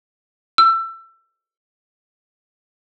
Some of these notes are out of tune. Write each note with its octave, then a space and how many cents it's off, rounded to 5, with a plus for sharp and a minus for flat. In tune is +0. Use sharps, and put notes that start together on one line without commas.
E6 +25